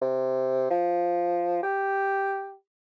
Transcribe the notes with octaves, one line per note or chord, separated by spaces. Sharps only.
C3
F3
G4